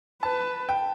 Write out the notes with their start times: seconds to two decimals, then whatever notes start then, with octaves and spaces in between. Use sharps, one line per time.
0.23 B4 A5
0.69 G5